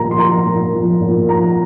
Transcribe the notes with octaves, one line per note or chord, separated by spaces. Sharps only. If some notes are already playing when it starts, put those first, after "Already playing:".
Already playing: A#2 F3 A#5
C6
F3 A#5
A#2
F3
A#2
F3 A#5